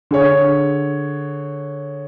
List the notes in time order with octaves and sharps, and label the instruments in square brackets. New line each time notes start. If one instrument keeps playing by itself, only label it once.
[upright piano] D3 G#4 C#5